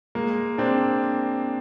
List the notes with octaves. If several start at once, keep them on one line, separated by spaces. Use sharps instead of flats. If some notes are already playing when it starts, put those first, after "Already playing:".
G#3 A#3
C4 D4